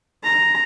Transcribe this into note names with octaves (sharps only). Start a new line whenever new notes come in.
A#5